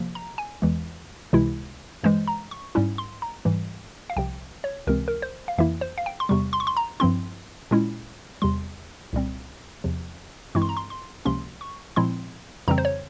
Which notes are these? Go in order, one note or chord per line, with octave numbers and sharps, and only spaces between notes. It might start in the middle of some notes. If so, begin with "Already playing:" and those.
Already playing: C3 F3 A#3
A#5
G#5
E2 E3 G#3
C#2 C3 E3 G#3 E4
G2 E3 G#3 C5
A#5
C#6
G#2 G3 C#4 E4
C6
A#5
G#2 E3 G3
F5
C2 C3 F3 G5
C#5
C#2 C3 E3 G#3 C4 A#4
A#4
C5
F5
F2 E3 A#3 E4 E5
C5
F5
G5
C6
E2 C3 G3 C#6
C6
C#6
C6
A#5
G2 F3 C4 E4 C6
A#2 G#3 C#4 E4
E2 C3 G3 C6
C2 A#2 G3 C4
E2 C3 F3
G2 E3 G#3 C4 E4 C#6
C6
A#5
C6
C6
C#2 C3 F3 A#3 C#4 C6
C#6
A#2 F3 G#3 C4 E4 C6
F2 C#3 E3 G3 C4 A#5
C5
C#5